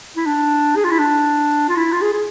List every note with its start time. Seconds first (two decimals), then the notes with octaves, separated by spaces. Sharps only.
0.17 E4
0.26 D4
0.76 G#4
0.85 F4
0.91 E4
0.99 D4
1.69 F4
1.76 E4
1.92 F4
2.02 G#4
2.13 G#4